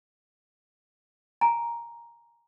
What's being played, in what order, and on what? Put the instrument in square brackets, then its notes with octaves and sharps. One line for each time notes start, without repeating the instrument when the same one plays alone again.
[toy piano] G#5 A#5